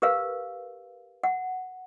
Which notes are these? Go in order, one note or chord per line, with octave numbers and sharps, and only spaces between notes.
G4 A#4 B4 F5
F#5